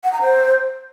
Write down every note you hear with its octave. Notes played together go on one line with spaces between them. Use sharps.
F#5
A#5
C5